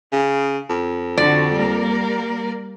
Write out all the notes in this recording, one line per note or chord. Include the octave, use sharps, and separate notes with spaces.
C#3
F2
D3 F#4 D5
G3 A#3 A#4